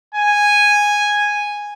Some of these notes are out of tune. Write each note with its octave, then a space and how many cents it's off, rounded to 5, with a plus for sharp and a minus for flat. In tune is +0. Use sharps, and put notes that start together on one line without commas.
G#5 -5